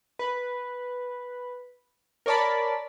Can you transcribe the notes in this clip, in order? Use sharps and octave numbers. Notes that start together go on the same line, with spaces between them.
B4
A#4 C#5 D5 A5 B5